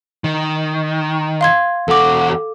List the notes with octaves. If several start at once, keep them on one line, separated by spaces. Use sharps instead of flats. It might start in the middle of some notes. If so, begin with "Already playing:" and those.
D#3
F5 C6 G#6
E2 F#4 A4 D6